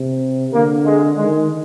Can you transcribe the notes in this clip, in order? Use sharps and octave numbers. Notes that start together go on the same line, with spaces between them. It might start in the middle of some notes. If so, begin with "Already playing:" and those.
Already playing: C3
D3 A#3
G#3
D#3 G#3